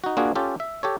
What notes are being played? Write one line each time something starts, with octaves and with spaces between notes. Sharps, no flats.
D#4 F#4
A#3 D4 F4 F#4 G#4
C#4 F4 G4 A4
E5
G4 A4 C#5